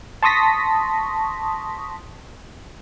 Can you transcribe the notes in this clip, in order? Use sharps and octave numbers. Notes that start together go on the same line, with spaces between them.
A5 C6 C#6 D#6 A#6 B6